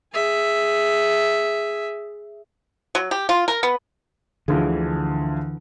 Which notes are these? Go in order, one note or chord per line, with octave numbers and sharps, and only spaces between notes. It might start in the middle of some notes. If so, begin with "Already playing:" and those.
G#4 E5
F#3
G4
F4
A#4
B3
D2 D3 E3 F3 G#4